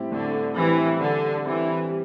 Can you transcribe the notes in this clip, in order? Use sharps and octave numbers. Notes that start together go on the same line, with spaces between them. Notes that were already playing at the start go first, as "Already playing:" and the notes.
Already playing: A2 G3 C4 E4 G4
A2 D3
E3 G3 C4 E4 G4
D3 G3
E3 C4 E4 G4
G3